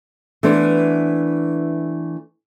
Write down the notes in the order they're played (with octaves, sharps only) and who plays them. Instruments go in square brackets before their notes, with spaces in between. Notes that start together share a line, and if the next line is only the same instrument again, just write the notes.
[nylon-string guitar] E3 A3 B3 D4 C5